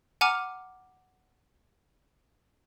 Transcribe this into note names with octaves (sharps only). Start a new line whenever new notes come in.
F#5 G#5 A#5 D6 F6